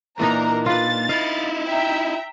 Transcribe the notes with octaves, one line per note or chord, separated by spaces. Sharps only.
A#2 E3 D4 D#4 A#4 A#5
F4 B4 A6
D#4 E4 F5
E5 G5 A#5